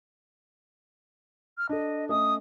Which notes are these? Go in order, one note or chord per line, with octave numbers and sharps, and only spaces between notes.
F6
D4 A4 D#5
A3 C#4 D#5 D#6